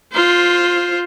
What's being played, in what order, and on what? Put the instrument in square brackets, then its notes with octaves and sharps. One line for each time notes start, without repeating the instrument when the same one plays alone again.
[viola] F4 C5